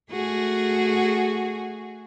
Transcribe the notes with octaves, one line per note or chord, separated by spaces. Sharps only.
A3 F#4 G#4